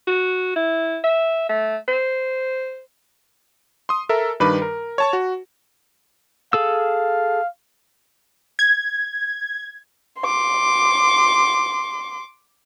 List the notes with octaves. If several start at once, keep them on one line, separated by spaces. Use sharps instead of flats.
F#4
E4
E5
A3
C5
C6 D#6
A4 A#4 E5
G2 D#3 B4 B5 D6
A#4
C#5 A5 C#6
F#4
G#4 A4 F5 E6
G#6
C6 D6